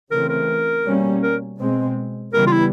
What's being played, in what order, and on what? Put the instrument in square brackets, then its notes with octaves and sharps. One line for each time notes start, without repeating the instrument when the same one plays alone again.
[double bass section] C#3 E3 A3 C4 [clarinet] A#4
[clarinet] A#4
[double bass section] B2 G3 A#3 C#4
[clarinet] A#4
[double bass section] B2 G#3 C4
[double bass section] C#3 E3 G3 B3 [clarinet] A#4
[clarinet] F4
E4